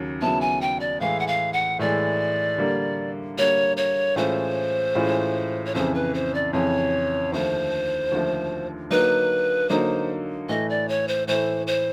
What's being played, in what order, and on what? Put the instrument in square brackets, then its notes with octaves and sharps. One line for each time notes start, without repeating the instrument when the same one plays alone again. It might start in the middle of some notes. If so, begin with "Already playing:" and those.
Already playing: [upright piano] D#2 C#3 F#3
[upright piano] D#2 C#3 F#3 B3 E4 [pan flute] A5
[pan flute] G#5
G5
D5
[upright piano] A2 E3 G#3 [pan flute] F5
[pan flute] F#5
F5
F#5
[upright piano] A2 E3 G#3 [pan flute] D5
[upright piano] D3 G3 A#3
[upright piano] D3 G3 A#3 [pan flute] C#5
[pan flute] C#5
[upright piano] A2 E3 G#3 C#4 F4 [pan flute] C5
[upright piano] A2 E3 G#3 C#4 F4
[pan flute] C#5
[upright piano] F2 C#3 E3 [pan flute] C5
[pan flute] B4
C5
D5
[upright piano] F2 C#3 E3 [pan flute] C#5
[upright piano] D#2 D3 F3 A3 [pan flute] C5
[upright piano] D#2 D3 F3 A3
[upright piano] D3 F#3 A#3 D#4 [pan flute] B4
[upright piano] D3 F#3 A#3 D#4 [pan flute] C5
[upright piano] A2 E3 A3 [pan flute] D#5
[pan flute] D5
C#5
C5
[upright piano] A2 E3 A3 [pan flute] C5
[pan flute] C5